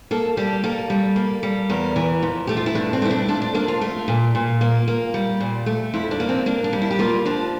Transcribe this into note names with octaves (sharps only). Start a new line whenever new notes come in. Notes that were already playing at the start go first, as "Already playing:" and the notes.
A#3 A4
G3 G4
A#3 A4
G3
A#3
G3
E2 A#4
E3
F2
A3 G4
F4
E4
G2 D4
C4
A3 E4
D4
F2 D4
D4
A#3 D4
F4
A3 F4
A#2
A#2
A#3
A#3
G3
A#2
A3
F2 E4
D4
A#3
C4
A#3 D4
D4
G3
E4
G4
A#3 F4
F3 D4